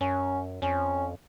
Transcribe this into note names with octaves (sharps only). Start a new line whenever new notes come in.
F#2 C#4
F2 C#4